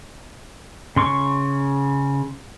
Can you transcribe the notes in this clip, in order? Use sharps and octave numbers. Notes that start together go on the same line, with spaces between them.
C#3 C6 C#6